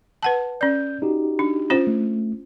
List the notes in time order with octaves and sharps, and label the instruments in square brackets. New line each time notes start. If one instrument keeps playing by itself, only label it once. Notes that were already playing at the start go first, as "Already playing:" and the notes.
[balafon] B4 F#5 A5
[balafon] C#4 D5 [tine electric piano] G6
[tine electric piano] D#4 F#4 G4
[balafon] D4
C#4 F4 C5
[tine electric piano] A3